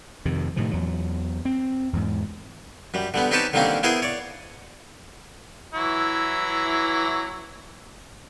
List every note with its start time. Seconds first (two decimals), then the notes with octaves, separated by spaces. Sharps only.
0.25 F2 C3 D#3
0.56 A2 C3 D#3 F3
0.71 E2 F#3
1.45 C4
1.93 E2 G#2
2.94 F#2 G3
3.14 D3 G3 B3
3.31 C4 D#4 G4 B4 C#5 A5
3.53 D3 D#3 G3 A#3 C4 C#4
3.83 B3 E4 G#4 A#4 C5
4.02 C#5 D5
5.74 E3 F#3 E4